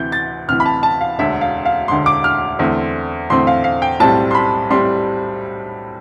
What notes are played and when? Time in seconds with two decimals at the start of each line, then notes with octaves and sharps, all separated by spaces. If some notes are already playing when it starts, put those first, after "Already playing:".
Already playing: D2 C3 E3 G6
0.12 A6
0.48 D2 C3 E3 F6
0.60 B5
0.66 A5
0.83 A5
1.01 F5
1.19 E1 D2 D3 E5
1.41 F5
1.66 F5
1.88 E1 D2 D3 C6
2.06 D6
2.24 F6
2.59 E2 D3 A3 C4
3.30 E2 D3 A3 C4 C6
3.47 F5
3.64 F5
3.82 G5
4.00 B1 A2 G3 C4 A5
4.31 C6
4.35 B5
4.70 A2 G3 C4 C6